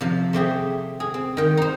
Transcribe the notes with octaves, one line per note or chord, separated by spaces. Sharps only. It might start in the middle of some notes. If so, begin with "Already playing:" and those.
C3 F3
A3 C4 G4 G#4
G#4
C4
D#3 G5
D#4 C5